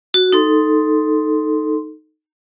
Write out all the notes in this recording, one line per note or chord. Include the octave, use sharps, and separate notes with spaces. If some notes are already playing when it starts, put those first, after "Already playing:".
F#4
D#4 A4 C6